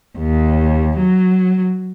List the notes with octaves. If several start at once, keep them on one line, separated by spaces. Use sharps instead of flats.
D#2
F#3